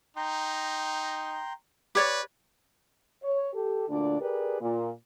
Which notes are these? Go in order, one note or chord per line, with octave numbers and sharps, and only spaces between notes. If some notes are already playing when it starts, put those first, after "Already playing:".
D#4 G5 A#5 C6
G4 B4 C#5 D5
C#5
G4 A4
D2 A#2 D3 D4 D5
G4 G#4 A#4 B4 D5
A#2